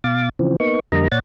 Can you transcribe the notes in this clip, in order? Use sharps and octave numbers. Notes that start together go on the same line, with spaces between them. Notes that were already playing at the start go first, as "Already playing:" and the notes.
B2 F5 D6 A6
C#3 E3 F3 C4
A#3 B3 D#4 C#6
F2 D3 G3 A#3 D#5 A#5
A#2 C#5 D5 F#5 A6